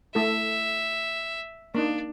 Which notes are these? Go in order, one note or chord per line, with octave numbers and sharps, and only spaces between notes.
A3 E4 A4 E5
A#3 D4 D#4